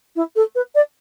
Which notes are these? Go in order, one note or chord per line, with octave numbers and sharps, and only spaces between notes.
E4
A4
B4
D5